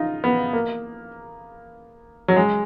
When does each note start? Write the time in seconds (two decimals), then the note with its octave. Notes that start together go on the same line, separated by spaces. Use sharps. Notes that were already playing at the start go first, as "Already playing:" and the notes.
Already playing: D#4 F4
0.24 B3
0.53 A#3
2.28 F#3
2.36 G#3